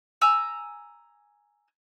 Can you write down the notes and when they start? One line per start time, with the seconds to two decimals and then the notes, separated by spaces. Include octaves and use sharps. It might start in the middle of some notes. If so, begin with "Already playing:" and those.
0.21 G#5 A#5 E6